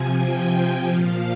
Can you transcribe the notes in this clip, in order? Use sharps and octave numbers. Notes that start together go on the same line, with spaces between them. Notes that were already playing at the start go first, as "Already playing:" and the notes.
Already playing: C3 F3 G#5
G5
G5
A#2 F3 F5